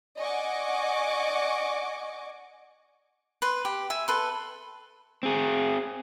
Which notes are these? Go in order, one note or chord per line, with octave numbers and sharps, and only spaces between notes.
D5 D#5 F#5 G#5 C#6 D6
B4 C6
G4
E5 G#5
A4 B4 C6
C4 G#4